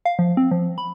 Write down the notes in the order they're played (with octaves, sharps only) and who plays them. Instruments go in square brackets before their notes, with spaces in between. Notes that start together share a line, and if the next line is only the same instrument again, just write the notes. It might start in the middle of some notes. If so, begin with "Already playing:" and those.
[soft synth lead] F5
F3
C4
F3
B5